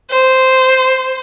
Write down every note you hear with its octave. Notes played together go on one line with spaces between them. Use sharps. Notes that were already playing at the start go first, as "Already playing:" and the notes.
C5